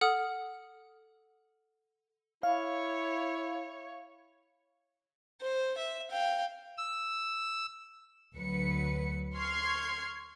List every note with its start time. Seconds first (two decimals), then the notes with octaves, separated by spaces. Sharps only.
0.01 A4 F#5 D#6 F6
2.43 E4 C#5 F5
5.42 C5
5.78 E5
6.11 F5 G5
6.78 E6
8.36 D2 F#3 B4 C#7
9.35 C6 C#6 F6 G#6 C7